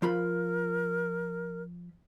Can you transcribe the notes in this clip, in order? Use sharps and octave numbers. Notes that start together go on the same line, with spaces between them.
F3 F4 A#4 B5